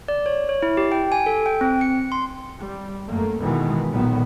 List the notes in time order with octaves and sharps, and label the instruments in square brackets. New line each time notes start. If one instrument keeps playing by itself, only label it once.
[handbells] D5
C#5
C#5
E4
G4
G5
G#5
A4
G5
C4
C#7
C6
[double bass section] G3
F#2 A3 A#3
B2 D#3 E3 G#3 B3
B1 A#2 D#3 B3